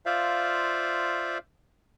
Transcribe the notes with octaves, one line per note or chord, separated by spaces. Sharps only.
F4 C5 D5 E5 F5